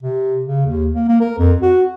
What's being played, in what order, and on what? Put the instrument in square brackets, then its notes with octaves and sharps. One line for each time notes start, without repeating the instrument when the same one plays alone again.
[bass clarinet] C3
C#3
D#2
A#3
A#3
A#4
F2
F#4